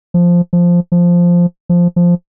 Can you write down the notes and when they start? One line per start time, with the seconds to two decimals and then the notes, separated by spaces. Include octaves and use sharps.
0.14 F3
0.53 F3
0.92 F3
1.69 F3
1.96 F3